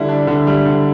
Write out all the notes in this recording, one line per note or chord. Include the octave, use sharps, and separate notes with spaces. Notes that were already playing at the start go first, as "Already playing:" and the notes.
Already playing: D3 G3 E4
D4
D3
G3
D3